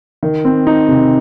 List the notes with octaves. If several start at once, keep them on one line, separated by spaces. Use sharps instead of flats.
D#3
C4
D#4
C3